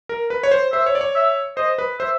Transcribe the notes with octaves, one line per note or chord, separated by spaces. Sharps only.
A#4
B4
C#5
C5
C5 E5
C#5
D5
C#5
E5
C5 D#5
B4
C5 E5